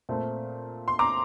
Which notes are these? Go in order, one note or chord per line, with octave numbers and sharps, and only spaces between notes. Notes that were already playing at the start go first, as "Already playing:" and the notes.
A#2 A3 C4
C6
A#5 D6